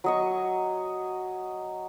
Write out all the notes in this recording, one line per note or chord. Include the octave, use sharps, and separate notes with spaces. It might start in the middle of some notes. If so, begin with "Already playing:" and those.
F#3 D#5 C#6